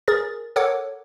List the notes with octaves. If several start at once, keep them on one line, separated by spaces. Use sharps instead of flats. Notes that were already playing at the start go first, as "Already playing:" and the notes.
G#4 A#4 A6
A4 A#4 C#5 F#5 D6